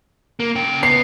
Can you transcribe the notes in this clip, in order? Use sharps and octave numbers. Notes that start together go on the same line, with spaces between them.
A#3
C#3 G5
B3 C7